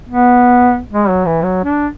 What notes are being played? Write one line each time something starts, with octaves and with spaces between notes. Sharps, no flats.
B3
G#3
F#3
E3
F#3
D4